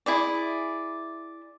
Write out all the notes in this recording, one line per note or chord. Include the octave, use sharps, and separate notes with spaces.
E4 G#4 D5